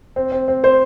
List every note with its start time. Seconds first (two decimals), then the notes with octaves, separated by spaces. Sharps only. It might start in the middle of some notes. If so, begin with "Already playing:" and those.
0.16 C4
0.32 C4
0.48 C4
0.63 C4 C5